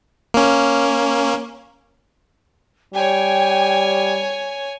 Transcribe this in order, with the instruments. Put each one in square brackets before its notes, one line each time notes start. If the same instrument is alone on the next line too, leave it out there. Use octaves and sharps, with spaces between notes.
[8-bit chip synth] A#3 C#4
[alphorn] G3 [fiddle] C#5 G#5 [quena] G5